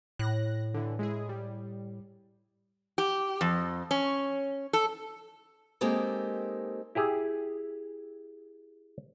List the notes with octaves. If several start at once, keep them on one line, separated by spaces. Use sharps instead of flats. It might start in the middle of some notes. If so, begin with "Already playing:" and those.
A2 F#6 A#6
D3 E3
G#3 E4 G#4
G3
G4
F2
C#4
A4
G#3 A#3 C4 D#4 G4 A4
E4 G4 G#4